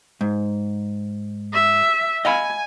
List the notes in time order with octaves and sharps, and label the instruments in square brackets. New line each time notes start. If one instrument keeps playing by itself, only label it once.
[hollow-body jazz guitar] G#2
[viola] E5
[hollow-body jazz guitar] D#5 F5 B5 [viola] G#5